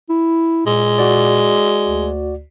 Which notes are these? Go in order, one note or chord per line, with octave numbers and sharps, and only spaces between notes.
E4
A#2 G#3
F#4 D5
D2